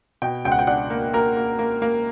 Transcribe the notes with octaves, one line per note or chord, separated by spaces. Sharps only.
B2 G5
C#2 G5
F#5
G5
D4 F#5
A#3
A#3 A#4
A#3
A#3
A#3